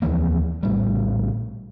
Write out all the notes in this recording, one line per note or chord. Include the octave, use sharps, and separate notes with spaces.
D#2 E3 F3 A#3
A#1 A2 G3